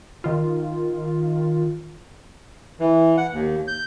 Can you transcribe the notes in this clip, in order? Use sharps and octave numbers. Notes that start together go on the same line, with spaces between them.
D#3 F4
E3
F#5
D#2
G6